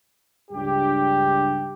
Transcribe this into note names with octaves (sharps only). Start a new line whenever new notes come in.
C#2 G2 D4 G4